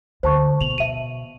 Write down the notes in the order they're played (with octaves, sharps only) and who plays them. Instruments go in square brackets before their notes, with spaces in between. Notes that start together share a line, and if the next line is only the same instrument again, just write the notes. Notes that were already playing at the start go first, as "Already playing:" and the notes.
[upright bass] D2 [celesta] C5 A5 C#6
[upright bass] B2 [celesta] F7 F#7
[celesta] E5 D#7